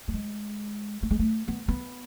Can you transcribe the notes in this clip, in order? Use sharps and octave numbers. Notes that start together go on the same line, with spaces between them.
A3
G#3
A3
G#3
A3
B3
B3